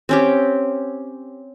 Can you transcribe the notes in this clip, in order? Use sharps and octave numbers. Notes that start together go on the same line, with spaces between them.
C4 C#4 G4